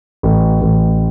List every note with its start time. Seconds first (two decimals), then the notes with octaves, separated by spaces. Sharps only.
0.23 A1
0.61 A1